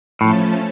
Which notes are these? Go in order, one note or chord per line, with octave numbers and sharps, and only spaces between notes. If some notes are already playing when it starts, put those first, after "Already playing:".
A2 F3 A3 C#4 A4